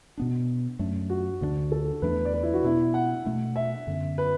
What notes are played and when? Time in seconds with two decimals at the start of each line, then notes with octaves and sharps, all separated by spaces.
0.18 B2 B3 D4
0.79 F#2 F#3 A3 D4
1.10 F#4
1.41 D2 D3 A3 D4
1.72 A4
2.02 E2 E3 A3 D4 B4
2.25 D5
2.33 B4
2.43 E4
2.54 F#4
2.63 B2 B3 D4 E4
2.94 F#5
3.26 B2 A3 D4
3.56 E5
3.87 F#2 D3 B3
4.18 B4